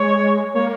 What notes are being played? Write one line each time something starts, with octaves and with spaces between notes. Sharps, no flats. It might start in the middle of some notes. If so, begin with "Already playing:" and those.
Already playing: G#3 C#5
A#3 C#5